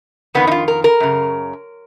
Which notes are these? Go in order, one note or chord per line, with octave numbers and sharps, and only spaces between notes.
F2 D#3 B3
D#4
F4
A#4
A#4
F#2 C#3